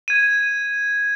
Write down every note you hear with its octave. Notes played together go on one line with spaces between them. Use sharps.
G#6 D#7